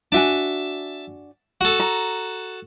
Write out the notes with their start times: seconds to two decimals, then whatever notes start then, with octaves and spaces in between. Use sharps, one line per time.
0.12 D4 F#4 E5 G#5 A5
1.61 F#4 A4
1.80 A#5